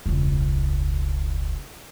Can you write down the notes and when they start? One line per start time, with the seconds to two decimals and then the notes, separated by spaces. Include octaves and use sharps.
0.06 E1 C#2